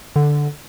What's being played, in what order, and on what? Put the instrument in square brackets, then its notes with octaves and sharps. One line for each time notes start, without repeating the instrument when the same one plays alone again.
[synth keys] D3